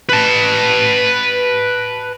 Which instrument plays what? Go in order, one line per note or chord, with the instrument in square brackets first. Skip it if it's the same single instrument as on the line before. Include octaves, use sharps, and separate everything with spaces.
[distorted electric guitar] B4 A5